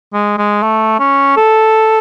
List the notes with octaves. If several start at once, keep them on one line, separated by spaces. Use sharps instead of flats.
G#3
G#3
A3
C#4
A4